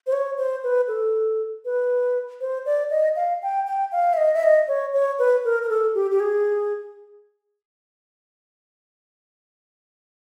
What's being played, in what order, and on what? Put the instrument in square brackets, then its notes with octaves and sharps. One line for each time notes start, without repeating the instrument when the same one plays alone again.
[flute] C5
C#5
C5
B4
A4
B4
C5
D5
D#5
F5
G5
G5
F5
E5
D#5
E5
D#5
C#5
C#5
B4
A#4
A#4
A4
G4
G4
G#4